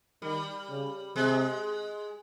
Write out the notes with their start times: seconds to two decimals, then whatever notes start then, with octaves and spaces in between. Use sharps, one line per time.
0.22 D#3 G3
0.69 C#3
1.16 C3 G#3